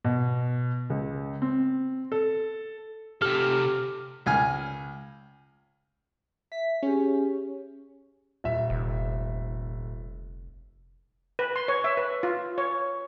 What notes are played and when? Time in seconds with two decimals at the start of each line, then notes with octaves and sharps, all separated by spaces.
0.04 B2
0.90 C#2
1.42 C4
2.12 A4
3.22 C3 G4 A4 F6
4.26 C#2 G#5 F6
6.52 E5 B6
6.83 C#4 G4 G#4
8.44 D#1 E5
8.70 F1
11.39 B4
11.56 C6
11.68 C#5
11.84 E5
11.97 B4
12.23 F4
12.58 C#5